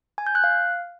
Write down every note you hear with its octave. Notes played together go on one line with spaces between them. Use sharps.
G#5
G6
F#6
F5